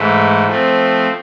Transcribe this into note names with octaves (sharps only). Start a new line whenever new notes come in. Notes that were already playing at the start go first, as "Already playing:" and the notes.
Already playing: G#2 E3 A3
F3 A3 C4